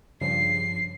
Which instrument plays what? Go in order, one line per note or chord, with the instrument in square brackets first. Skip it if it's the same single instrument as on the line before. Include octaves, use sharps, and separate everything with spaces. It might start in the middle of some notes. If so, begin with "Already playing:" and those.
[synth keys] G2 C#3 F3 [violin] C7